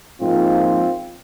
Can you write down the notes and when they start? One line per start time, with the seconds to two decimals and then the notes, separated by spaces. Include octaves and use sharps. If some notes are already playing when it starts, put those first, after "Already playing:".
0.20 G#2 F3 A#3 C4 F4